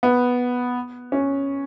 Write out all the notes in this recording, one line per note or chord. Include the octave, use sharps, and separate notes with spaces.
B3
C#4